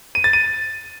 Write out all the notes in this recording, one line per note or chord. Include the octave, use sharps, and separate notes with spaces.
D#7
A6
D#7